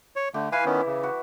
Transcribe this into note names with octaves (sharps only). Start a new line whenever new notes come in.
C#5
D3 A3 G4
E3 E4 B4 F5 G#5
D#3 B3 C#4
C#3
F#4